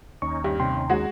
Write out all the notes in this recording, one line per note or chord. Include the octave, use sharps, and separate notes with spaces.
D#2 C#4 D#4 C#6
G2 G4
C3 G5 C6
G#3 F#4